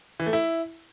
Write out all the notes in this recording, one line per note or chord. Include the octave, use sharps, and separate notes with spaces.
E3
A3
E4